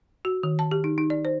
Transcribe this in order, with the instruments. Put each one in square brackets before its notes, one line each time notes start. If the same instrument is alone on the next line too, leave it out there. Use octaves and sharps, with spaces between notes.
[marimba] F#4
D#3
A5
G4
D#4
D#4
D5
C5